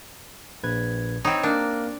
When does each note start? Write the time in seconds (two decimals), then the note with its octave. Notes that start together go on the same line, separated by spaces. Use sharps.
0.63 A#1 B4 G#6
1.25 C4 D#4 C#5 A#5 B5
1.43 A#3 D4 A#4